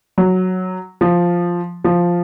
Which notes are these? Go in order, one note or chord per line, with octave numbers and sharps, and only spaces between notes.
F#3
F3
F3